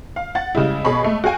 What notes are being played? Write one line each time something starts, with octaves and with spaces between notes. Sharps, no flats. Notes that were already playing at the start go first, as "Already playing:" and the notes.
F5
F#5 A6
C#3 G3 G#3 E4
B2 G#4 C#5 D#5 B5 C#6
G#3 A3
F#4 G#4 F5 G5 G#5